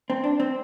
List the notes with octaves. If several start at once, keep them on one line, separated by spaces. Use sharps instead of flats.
C4
D4
C4